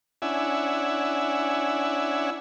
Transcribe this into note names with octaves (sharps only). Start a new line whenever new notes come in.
C#4 D4 E4 E5 F#5 G#5